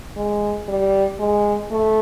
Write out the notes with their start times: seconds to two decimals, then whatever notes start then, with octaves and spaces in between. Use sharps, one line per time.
0.16 G#3
0.68 G3
1.19 G#3
1.71 A3